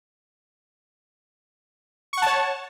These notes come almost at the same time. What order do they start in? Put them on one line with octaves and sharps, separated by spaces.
C#6 F#5 A5 C#5